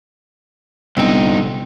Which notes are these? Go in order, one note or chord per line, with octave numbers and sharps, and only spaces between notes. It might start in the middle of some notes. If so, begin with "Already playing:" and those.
G1 C2 C4 D#4 G5